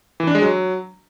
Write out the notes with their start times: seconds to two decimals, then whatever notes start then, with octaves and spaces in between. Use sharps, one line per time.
0.20 E3
0.27 D4
0.35 G#3
0.42 F#3